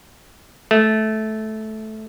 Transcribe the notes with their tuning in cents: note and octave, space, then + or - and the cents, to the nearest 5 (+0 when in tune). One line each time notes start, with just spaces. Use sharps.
A3 -15